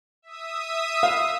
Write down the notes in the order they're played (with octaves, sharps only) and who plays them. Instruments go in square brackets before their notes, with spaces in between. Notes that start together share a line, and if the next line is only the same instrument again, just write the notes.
[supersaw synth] E5 D#6
[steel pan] F5